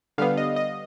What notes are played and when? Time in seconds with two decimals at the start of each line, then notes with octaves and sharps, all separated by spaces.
0.18 D3 G3 B3 F5
0.37 D#5
0.56 D#5